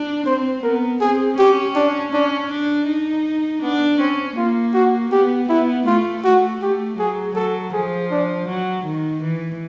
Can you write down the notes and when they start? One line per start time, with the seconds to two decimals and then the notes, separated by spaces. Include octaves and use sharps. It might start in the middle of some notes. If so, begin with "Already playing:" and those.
Already playing: D4
0.26 C4 C5
0.63 B3 A#4
1.00 C4 G#4
1.38 C#4 G4
1.75 D4
2.13 C#4 D4
2.51 D4
2.87 D#4
3.62 B3 D4
3.99 C4 C#4
4.37 A#3 F4
4.74 F#4
5.12 B3 G4
5.49 B3 E4
5.86 A3 F4
6.23 A3 F#4
6.61 A3 G4
6.98 F#3 G#4
7.35 F#3 A4
7.73 F3 G#4
8.11 D4
8.48 F#3
8.85 D#3
9.23 E3